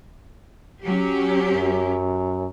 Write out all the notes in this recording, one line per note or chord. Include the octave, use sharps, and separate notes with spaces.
F#3 C#4 G4
F#2